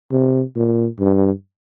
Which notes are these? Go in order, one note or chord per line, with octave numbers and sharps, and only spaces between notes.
C3
A#2
G2